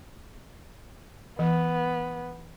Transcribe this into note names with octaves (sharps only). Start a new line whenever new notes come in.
E3 B3